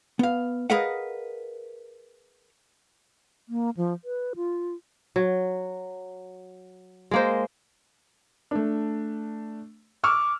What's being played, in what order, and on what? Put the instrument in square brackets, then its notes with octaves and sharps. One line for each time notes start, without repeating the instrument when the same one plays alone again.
[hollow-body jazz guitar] B3 F5
G#4 A#4 B4 D#5 F5 F#5
[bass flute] A#3
F3
B4
F4
[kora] F#3
G#3 A#3 C5
[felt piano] A3 D4
[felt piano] C#6 E6 F6 [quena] D6